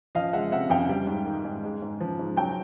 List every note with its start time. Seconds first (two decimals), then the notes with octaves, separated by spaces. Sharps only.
0.15 F3 D#5 F5
0.33 G#3 E5 F#5
0.51 C3 E5 F#5
0.70 F2 F5 G5
0.89 G3
1.07 G#2
1.25 D#3
1.45 G#2
1.63 G#3
1.82 G#2
2.00 F3
2.19 G#2
2.37 F#3 G5 A5